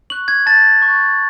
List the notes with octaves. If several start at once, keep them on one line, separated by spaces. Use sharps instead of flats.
C#6 F#6 F#7
G#6
A5 A6
C#6 F#6